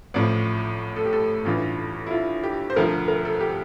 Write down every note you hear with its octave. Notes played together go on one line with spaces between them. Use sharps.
A1 A2 F3 D5
A4
G4
A4
A1 G2 E3 F4
E4
F4
G4
C5
E1 D2 D3 F3 A#4
A#4
A4
G4